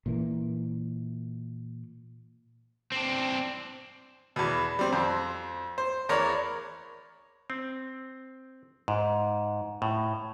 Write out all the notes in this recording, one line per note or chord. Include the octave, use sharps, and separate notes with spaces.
A#2 E3 A#3
C4 D4
E2 B2
G3 C4
F2 C5
C5
E2 A#4 C#5 D5
C4
G#2
A2